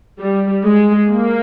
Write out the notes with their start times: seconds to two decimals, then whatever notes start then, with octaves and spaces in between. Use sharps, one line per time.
0.19 G3
0.64 G#3
1.09 A#3